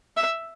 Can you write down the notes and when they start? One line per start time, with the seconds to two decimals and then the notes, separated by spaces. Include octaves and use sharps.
0.17 E5